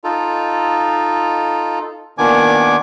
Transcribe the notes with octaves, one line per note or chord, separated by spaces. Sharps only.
D#4 F4 A4
A#2 D#3 B3 D4 G#5 D6